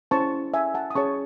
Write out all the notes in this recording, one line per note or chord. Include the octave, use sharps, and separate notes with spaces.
C#4 E4 C5 A5 C#6
E5 G#5
F#5 A5
D#6
C#4 G#4 C#5 A5 C#6